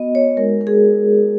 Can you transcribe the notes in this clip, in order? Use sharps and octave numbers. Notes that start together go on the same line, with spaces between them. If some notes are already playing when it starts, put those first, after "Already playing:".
Already playing: B3 F#4 D#5
C#5
G#3 D#4 F#4 A#4
A#4
G#4